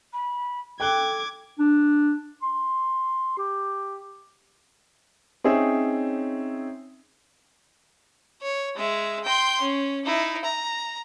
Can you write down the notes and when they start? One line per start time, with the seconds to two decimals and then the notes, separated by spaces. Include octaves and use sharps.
0.13 B5
0.80 A4 G5 D6 F#6 G#6 G7
1.59 D4
2.42 C6
3.38 G4
5.44 C4 C#4 D#4 G#4 C#5 E5
8.42 C#5
8.76 G#3 E5
9.24 G5 C6
9.61 C#4
10.05 D#4 E4
10.44 A#5